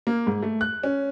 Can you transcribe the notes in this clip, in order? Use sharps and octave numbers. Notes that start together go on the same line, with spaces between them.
A#3
G#2
A3
F#6
C#4